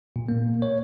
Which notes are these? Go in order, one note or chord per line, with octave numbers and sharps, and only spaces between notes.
A#2
A#3
C#5